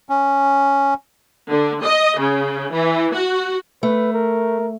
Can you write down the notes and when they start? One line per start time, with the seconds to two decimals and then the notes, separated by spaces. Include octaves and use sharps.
0.09 C#4
1.50 D3
1.84 D#5
2.18 C#3
2.72 E3
3.13 F#4
3.83 A3 B4
4.14 A#4